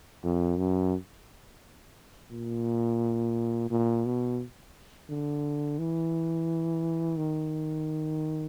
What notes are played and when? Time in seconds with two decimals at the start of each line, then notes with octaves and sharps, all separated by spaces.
0.24 F2
0.58 F#2
2.32 A#2
3.71 A#2
4.06 B2
5.10 D3
5.79 E3
7.17 D#3